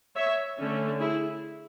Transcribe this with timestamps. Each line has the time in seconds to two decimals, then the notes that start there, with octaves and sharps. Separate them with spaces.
0.17 C#5 E5
0.58 D3 A3 C#4
0.99 E4 G#4